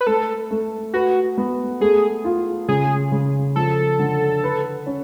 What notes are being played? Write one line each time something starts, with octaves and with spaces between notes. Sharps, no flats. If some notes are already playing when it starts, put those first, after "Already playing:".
B4
A3 A4
A3
F#4 B4
B3
A3 G#4
F4
C#3 G#4
C#3
F3 A4
D3
B4
C#4